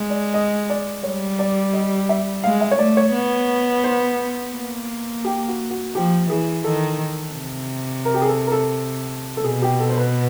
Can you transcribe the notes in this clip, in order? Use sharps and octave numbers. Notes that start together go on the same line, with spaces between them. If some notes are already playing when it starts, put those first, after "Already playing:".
Already playing: G#3
D5
D#5
D5
G3 C#5
D5
D#5
E5
G#3 F5
E5
C#5
A3 D5
C#5
B3
C5
A#3
G4
F#4
F#4
F3 G4
E3 G#4
D#3 A4
C3
A#4
G4
G#4
A4
A#4
A4
A4
B2 G#4
G4
A4
C5
B4